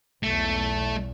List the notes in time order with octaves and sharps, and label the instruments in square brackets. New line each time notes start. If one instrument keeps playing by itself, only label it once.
[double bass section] B1 E2 [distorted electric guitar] A3